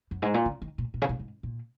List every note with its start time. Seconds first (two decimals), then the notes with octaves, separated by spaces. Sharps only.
0.11 F#2
0.22 G#2
0.34 A#2
0.46 C#3
0.62 D#3
0.78 A#2
0.94 A#2
1.02 C#3
1.09 A#2
1.19 G#2
1.43 A#2